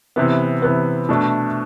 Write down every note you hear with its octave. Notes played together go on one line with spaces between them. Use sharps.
C3 E3 B3
C3 E3 B3
B2 A3 D4